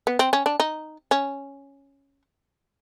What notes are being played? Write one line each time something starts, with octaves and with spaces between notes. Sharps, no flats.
B3
C4
C#4
D4
D#4
C#4